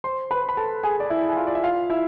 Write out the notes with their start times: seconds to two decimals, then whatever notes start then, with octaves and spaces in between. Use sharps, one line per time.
0.04 C5 C6
0.31 B4 B5
0.49 B5
0.57 A4 A5
0.83 G#4 G#5
1.00 D5
1.10 E4 E5
1.30 G#5
1.37 F4 F5
1.47 D5
1.55 E5
1.63 F4 F5
1.90 E4 E5